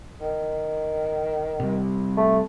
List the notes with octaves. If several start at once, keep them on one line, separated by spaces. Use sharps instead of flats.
D#3
C3 G3
A3